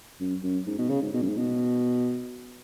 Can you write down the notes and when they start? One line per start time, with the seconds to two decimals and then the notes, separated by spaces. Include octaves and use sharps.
0.20 F#2
0.43 F#2
0.67 G#2
0.78 B2
0.90 C#3
1.02 G#2
1.14 B2
1.22 F#2
1.29 G#2
1.37 B2